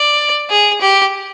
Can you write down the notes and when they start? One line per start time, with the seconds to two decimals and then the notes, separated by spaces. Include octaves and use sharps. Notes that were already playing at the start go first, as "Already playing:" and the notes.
Already playing: D5
0.50 G#4
0.81 G4